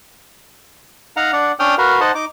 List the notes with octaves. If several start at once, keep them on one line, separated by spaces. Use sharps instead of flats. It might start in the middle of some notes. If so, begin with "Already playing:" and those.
D#4 F5 F#5 A#5
D4 D5 F#5
C#4 D4 G5 D#6 F6
F#4 A#4 B4 F5
D#4 C5 D#5 F#5 A5
D#4 D6